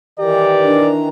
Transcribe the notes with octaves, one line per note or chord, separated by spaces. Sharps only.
D#3 E3 G4 D5 A#5
D4